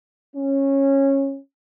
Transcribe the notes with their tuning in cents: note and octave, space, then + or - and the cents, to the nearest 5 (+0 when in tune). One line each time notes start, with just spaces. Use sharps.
C#4 -15